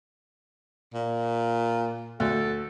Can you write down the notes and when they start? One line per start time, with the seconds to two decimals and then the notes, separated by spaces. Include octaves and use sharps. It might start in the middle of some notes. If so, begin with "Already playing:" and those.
0.94 A#2
2.20 D2 A4